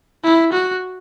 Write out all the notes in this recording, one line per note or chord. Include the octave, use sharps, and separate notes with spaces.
E4
F#4